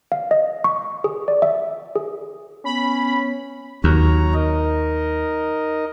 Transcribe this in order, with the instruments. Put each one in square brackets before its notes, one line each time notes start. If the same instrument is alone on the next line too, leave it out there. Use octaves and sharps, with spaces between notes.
[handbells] F5
D#5
C#6
G#4
D5
E5
G#4
[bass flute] B3 [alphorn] C#4 [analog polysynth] B5
[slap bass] D#2 [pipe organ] F#3 C#5 A#5
[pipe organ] D#4 A#4 D#5